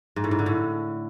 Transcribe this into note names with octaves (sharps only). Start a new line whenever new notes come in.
G#2
A2
G#2
D3
A2